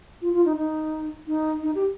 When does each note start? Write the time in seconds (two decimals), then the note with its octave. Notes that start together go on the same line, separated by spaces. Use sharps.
0.22 F4
0.33 F4
0.45 D#4
0.57 D#4
1.27 D#4
1.63 D#4
1.75 G4